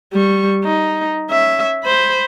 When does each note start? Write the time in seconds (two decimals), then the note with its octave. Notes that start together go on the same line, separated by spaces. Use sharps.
0.13 G3 C#6
0.64 D#4
1.30 C#4 E5
1.84 C5 B5